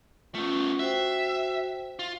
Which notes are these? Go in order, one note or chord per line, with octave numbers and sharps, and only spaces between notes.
A3 B3 C#4 F4
F#4 C5 E5 G5
F4